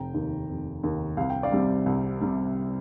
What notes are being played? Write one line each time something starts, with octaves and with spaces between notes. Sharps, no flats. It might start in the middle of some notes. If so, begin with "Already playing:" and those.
Already playing: F1 G5 A#5
D#2 D#3
F1
D#2 D#3
C2 F5
G5
D5 F5
C3 G3
C2
C3 G3